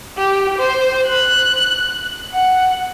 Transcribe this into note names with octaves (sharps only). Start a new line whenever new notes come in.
G4
C5
F#6
F#5